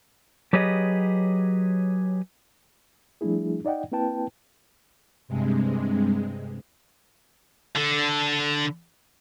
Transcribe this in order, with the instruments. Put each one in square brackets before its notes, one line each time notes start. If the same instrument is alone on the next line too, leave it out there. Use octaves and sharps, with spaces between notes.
[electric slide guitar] F#3 G4 G#4 B4 C#5 D#5
[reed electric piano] F3 G3 A3 D4 E4 G#4
D#4 D5 D#5 F#5 G5
A#3 C4 E4 B4 G5 A5
[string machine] G2 C3 G#3
[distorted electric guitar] D3 A4